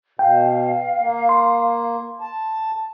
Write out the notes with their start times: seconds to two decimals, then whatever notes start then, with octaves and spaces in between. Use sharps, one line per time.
0.19 B2 F5 G5
1.00 A#3
1.29 C6
2.21 A5